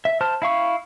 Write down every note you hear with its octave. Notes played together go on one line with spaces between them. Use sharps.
E5
C5 A5 F6
E4 F5 C#6